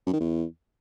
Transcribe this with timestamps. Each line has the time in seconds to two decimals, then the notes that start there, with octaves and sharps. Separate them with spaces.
0.07 F#2
0.14 D#3
0.20 E2